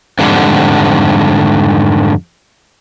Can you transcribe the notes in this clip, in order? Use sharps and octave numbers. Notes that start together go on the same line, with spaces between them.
F2 G#2 D3 G3